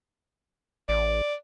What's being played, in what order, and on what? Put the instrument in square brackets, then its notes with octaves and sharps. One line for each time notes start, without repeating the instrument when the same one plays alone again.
[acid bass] A1 [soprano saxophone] D5